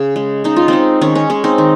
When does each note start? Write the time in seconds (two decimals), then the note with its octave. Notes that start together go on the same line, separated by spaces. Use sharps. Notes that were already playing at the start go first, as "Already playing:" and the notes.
Already playing: C#3 G#4
0.16 G#3
0.44 C#3 D#4
0.56 F4
0.68 G#3 C4 D#4
1.01 D#3 C#4
1.15 C#4
1.30 G#3 C#4
1.44 C4 D#4
1.58 D#3